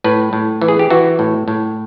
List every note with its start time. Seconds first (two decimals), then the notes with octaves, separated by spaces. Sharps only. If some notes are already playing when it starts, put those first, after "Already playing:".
0.04 A2 B4
0.33 A2
0.61 E3
0.68 G#4
0.79 G4
0.90 E3 F#4
1.19 A2
1.48 A2